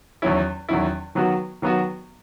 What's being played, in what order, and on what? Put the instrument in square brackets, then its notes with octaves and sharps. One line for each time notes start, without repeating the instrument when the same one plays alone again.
[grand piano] E2 D#3 F#3 C#4 E4
E2 D#3 F#3 C#4 E4
D#3 F#3 B3 F#4
D#3 F#3 B3 F#4